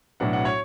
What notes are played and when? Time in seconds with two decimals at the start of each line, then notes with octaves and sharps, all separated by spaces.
0.20 B1 A2 F#3 B3 D4 F#5
0.33 F#5
0.45 C#5